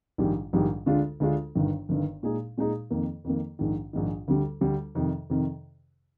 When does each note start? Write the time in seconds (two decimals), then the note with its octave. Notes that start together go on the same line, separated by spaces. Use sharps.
0.18 A#1 G#2 D#3 G3
0.53 A#1 G#2 D#3 G3
0.86 D2 D3 G#3 D4 F4
1.20 D2 D3 G#3 D4 F4
1.55 G1 G2 D#3
1.89 G1 G2 D#3
2.23 A#2 G#3 D#4 G#4
2.58 A#2 G#3 D#4 G#4
2.91 F2 D#3 A#3
3.24 F2 D#3 A#3
3.59 A#1 G#2 D#3
3.93 A#1 G#2 D#3
4.28 D2 D3 G3
4.61 D2 D3 G3
4.95 F2 C3 D#3
5.30 F2 C3 D#3